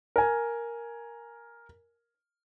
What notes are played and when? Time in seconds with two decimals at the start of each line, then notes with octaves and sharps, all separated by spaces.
0.16 A#4 G#5